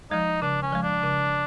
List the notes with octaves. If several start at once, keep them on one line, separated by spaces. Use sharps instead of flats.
F3 G#3 D#4
C#3 D4
C#4
F3 G#3
D4
C#3